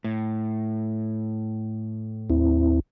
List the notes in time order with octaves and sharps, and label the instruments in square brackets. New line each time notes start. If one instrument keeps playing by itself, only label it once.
[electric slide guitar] A2
[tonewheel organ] D#2 C4 E4